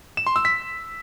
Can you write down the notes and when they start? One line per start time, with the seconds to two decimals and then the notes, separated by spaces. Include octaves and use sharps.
0.17 E7
0.27 C6
0.36 E6
0.45 B6